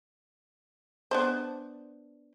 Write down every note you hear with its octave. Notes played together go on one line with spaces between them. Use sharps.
B3 D4 C5